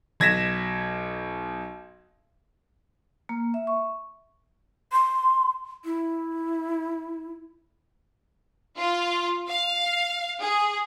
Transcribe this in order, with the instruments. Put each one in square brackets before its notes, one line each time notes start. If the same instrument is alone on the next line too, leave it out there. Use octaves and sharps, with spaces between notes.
[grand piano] B1 G#6 A#6 B6 E7
[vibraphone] A#3
E5
C#6
[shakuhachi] C6
E4
[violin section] F4
F5
G#4